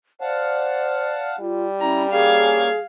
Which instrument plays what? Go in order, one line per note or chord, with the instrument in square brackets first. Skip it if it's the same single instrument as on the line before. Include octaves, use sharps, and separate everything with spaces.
[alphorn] C5 [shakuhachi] D5 [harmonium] F5 F#5 A5
[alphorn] G3 [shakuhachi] F4
[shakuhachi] C#4 [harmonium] E4 [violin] A#5
[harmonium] A#3 C#4 [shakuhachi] G#4 [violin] F5 G#6